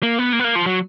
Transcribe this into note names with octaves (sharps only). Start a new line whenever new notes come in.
A#3
B3
A#3
B3
A#3
F3
F#3